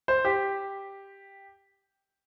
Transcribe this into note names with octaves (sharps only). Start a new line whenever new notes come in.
C5
G4